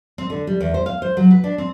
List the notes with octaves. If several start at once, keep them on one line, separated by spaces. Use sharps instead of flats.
C4
D3
G3
E2
C5
F5
C5
F#3
B4
D4
C4